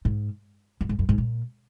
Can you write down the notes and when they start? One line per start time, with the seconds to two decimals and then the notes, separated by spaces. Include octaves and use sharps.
0.05 G#2
0.81 F#2
0.89 G#2
0.99 F#2
1.09 G#2
1.18 A#2